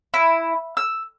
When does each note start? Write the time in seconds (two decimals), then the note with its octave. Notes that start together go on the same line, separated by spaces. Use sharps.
0.14 E4
0.77 E6